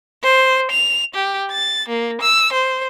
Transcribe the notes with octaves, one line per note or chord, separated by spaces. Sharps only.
C5
F7
G4
A6
A#3
E6
C5